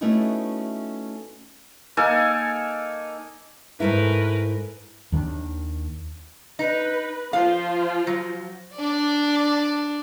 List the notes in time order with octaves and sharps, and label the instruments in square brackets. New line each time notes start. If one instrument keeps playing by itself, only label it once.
[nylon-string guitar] A3 B3 C#4 D#4 E4 F#4
[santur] A#3 D#4 A4 G#5
[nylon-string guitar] G#2 A3 E4 [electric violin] A#4 B4
[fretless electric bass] D#2 D#3 C#4 D4
[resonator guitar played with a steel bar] D#4 [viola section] B4
[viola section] F3 F4 C5 [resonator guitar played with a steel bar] F5
[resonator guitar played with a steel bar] F#3
[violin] D4 D5